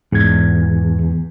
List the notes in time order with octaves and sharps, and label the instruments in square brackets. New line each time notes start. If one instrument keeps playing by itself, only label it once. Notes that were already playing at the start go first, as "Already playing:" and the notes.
[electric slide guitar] E2 [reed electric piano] G#2 G#6